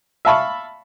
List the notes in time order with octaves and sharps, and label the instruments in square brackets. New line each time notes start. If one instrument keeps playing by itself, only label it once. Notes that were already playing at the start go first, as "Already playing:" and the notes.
[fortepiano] E5 F5 A5 B5 C#6